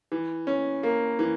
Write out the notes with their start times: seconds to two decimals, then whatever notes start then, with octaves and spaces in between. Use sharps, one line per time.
0.12 E3
0.47 C#4
0.83 A#3
1.19 E3